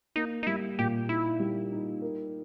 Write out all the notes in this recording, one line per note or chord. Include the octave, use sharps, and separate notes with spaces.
A#3 D#4
D#4
G3 E4
A#2 G4
D#4 E4
G3
D#4
A#4